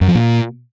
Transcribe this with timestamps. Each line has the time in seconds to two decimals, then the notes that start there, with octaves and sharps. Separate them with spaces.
0.01 F#2
0.08 F3
0.15 A#2